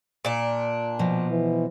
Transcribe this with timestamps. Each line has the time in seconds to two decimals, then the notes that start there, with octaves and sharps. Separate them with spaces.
0.25 A#2 D4
0.99 B2 F3
1.30 E3